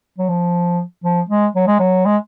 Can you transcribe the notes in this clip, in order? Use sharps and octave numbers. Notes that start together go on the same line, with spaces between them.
F#3
F3
F3
G#3
F#3
G#3
F#3
G#3